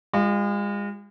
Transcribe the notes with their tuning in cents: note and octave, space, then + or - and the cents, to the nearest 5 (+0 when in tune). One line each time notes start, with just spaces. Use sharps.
G#3 -40 F4 +0